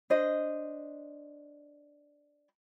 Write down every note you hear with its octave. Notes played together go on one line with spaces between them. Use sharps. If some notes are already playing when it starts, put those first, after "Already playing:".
D4 C5 D#5